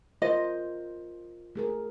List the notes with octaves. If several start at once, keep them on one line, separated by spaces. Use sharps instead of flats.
F4 A#4 C5 D#5
A3 G#4 A#4